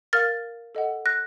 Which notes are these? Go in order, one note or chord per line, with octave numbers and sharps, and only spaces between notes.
A#4 F5 F6 A6
A4 D#5 F#5
F#6 A#6